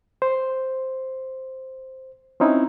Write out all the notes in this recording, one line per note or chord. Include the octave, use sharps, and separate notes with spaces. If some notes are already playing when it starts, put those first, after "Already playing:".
C5
C4 C#4 D#4 E4